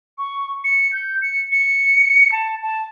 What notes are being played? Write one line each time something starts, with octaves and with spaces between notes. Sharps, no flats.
C#6
C#7
G6
C#7
C#7
A5
A5